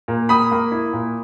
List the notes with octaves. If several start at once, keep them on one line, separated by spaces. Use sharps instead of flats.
A#2
A#3 B5 D#6
A#3
E4
A#2